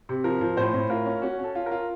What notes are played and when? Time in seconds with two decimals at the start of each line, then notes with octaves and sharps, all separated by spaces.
0.09 C3
0.24 F3 A#4
0.41 F3
0.57 A2 C5
0.74 A2
0.90 F4 A#4
1.06 C#4
1.22 C#4 F#4
1.39 C#4 A4
1.55 F4
1.66 A#4
1.72 F4